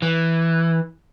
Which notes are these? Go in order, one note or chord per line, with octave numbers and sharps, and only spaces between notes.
E3